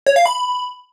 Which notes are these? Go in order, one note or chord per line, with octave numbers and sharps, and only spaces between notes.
C#5
F5
B5